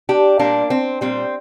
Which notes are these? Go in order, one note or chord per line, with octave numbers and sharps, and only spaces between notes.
D4 G4
A#2 G3 A#3 D4
C4
A#2 G3 C4